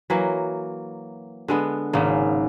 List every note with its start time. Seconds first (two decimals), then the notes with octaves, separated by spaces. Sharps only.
0.10 E3 F#3 A#3
1.48 D3 G#3 B3
1.93 G#1 C#3 A#3